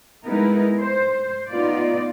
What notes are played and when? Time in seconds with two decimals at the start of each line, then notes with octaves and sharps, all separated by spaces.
0.25 G#3 B3 D#4 E4 A#4 B4
0.79 C5
1.48 B3 D#4 F4 D5